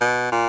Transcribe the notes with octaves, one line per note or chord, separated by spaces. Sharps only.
B2
A#2